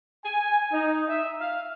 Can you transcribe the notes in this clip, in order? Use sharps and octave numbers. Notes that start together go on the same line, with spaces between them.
G#5
D#4
E5
F5